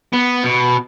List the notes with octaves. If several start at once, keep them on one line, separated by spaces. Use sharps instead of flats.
B3
B2